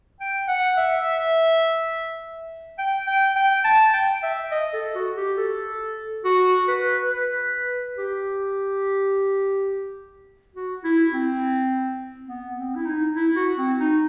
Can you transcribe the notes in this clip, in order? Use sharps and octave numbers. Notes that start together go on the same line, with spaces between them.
G5
F#5
E5
G5
G5
G5
A5
G5
E5
D#5
A4
F#4
G4
A4
F#4
B4
B4
G4
F#4
E4
C4
B3
C4
E4
D#4
E4
F#4
C4
D#4